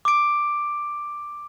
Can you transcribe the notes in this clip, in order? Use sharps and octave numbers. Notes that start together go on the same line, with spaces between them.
D6 D7